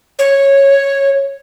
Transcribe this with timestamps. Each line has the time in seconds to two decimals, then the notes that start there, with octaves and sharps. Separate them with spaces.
0.19 C#5